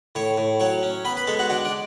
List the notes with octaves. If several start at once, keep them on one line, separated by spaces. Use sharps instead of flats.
A2 C#5 C#6
A2
F#3 C#5 C#6
C#4
B3 B4 B5
B4 B5
G#3 A4 A5
F#4 F#5
D4 F#4 F#5
D4 D5